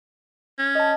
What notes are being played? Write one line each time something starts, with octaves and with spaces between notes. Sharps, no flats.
C#4
D#5 A5